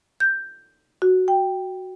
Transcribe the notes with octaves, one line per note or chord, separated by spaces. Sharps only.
G6
F#4
G5